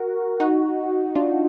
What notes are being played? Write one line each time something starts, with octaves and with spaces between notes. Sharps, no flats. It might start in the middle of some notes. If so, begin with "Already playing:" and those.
Already playing: F#4 A#4
D#4 F#4
D4 F4